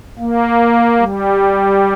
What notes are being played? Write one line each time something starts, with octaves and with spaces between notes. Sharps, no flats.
A#3
G3